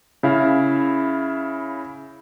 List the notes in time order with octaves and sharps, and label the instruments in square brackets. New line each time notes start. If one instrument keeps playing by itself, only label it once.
[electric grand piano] C#3 E4 F5